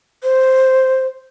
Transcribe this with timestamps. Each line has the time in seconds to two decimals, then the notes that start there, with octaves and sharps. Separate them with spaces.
0.23 C5